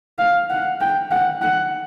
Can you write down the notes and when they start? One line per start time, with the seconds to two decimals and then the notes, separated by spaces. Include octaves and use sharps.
0.19 F5
0.50 F#5
0.81 G5
1.11 F#5
1.42 F#5